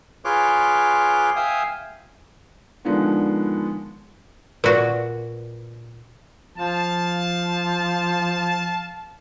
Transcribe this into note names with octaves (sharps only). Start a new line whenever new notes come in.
F4 G#4 B4 C#5 C6 D6
E5 F5 G5 G#5 D#6
D3 D#3 F3 G#3 B3 D4
A#2 F#4 B4 D5
F3 F5 A5